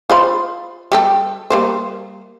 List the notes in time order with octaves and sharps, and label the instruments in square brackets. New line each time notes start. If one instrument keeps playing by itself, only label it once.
[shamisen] F4 C5 B5
G3 G4 A4
G3 A#3 C5